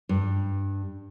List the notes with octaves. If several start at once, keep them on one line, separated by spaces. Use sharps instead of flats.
G2